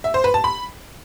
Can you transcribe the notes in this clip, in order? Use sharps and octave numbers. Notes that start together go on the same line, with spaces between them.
E5
C5
B4
A5
B5